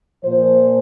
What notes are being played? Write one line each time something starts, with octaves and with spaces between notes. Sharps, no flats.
A#2 F3 C5